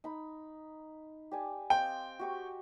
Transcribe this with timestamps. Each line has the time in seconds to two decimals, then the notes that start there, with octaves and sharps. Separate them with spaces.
0.04 D#4 B5
1.31 G4 D5 G#5
1.70 C4 D#5 F5 G5
2.19 F#4 G4 C#6